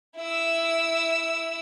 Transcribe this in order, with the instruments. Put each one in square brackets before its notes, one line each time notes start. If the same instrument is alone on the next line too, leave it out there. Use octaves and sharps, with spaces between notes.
[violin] E4 E6